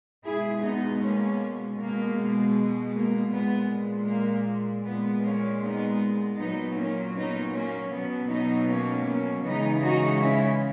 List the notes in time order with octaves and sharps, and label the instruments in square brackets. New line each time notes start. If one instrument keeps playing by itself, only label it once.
[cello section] B2 G#3 E4 G#4
B3 D#4
A#3 C#4
B2 G#3 A#3
A#3
A#2 G#3 B3
A#3
A#2 G#3 B3
A#3 C#4
B3 D#4
A#2 F#3 B3 D#4
A#3 C#4
B3 D#4
A#3 C#4
B2 F#3 B3
B3 D#4
A#3 C#4
A#3 C#4
C#3 E3 G#3 B3 D#4
D#4 F#4
C#4 E4